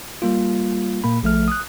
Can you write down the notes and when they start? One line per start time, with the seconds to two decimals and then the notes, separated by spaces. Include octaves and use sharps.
0.22 G3 A#3 F4
1.04 A#2 A#3 B5
1.23 A#1 F3 A3 F6
1.48 D#6 F#6